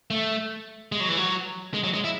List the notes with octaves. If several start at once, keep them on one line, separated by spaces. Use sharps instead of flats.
A3
G#3
F#3
E3
F#3
G#3
F#3
G#3
E4